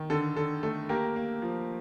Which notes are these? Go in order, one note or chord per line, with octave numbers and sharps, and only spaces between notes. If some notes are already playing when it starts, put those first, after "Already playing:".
Already playing: D#3
D3 A4
D3 A4
A3 A4
A#3 G4 A#4
A#3
F3